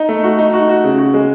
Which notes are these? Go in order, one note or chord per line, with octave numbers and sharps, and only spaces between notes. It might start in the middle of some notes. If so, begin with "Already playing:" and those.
Already playing: D#4
A3
F#4
D#4
F#4
F#4
C#3
F#4
G#3